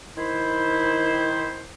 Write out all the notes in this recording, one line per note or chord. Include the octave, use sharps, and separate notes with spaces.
D#3 E4 C5